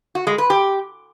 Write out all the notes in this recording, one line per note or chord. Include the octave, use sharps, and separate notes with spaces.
F#4
G#3
B4
G4